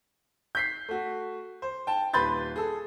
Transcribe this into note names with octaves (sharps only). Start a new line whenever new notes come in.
G6 B6 C7
A3 F#4
C5
G5 A5
D#1 B4 B5 C6 G6 A6
G#4 A4